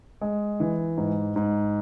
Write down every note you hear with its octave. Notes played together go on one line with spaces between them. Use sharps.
G#3
E3
G#2
G#2